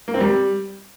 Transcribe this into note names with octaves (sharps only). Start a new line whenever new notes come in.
A#3
C4
G3